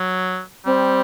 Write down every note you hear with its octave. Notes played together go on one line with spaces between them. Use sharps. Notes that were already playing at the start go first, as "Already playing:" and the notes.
Already playing: F#3
G3 C4